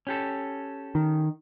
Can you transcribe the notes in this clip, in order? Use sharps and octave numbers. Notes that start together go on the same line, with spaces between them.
C#4 G4 A4
D#3